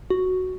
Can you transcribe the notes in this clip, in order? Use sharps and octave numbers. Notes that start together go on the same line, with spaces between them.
F#4